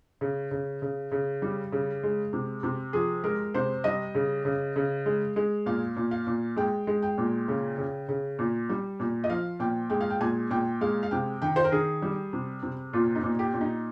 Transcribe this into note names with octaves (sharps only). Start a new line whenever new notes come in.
C#3
C#3
C#3
C#3
G3
C#3
G#3
C3
C3
F3 G#4
G#3 A#4
C3 C5
G3 D#5
C#3
C#3
C#3
G#3
G#3
A#2 F5
A#2
F5
A#2
G#3 G5
G#3
G5
A#2
C#3
C#3
C#3
A#2
G3
A#2
D#5
F3 F5
A#2 G5
G#3 G5
F5
G5
A#2 G#5
A#2 G5
G#3 F5
F5
C3 G5
D#3 G5
C5
A#4
D#3 G#4
G3
C3
C3
A#2 F4
D#4
A#2
G4
A#2
D#4